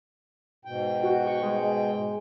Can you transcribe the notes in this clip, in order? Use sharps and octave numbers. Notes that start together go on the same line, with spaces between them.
G#2 B2 G5
F#4
C#6
G#3